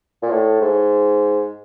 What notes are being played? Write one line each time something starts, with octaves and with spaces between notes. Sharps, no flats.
A#2
A2
G#2